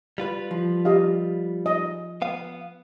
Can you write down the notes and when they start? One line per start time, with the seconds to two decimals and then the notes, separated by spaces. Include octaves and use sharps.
0.18 G3 F4 B4
0.51 F3
0.85 G4 D#5 F5
1.66 D#5
2.22 B3 F5